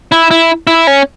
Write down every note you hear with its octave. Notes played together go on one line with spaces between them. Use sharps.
E4
E4
E4
C#4